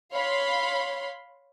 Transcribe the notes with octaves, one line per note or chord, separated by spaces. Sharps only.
C#5 F5 B5 C6